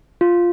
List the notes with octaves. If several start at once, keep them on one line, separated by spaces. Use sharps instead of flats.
F4